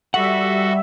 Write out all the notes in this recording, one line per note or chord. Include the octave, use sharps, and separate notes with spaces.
G3 F#4 A4 E5 F#5